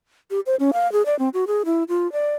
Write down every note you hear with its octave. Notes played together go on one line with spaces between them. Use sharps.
G4
C5
C#4
F5
G#4
D5
C4
F#4
G#4
E4
F4
D5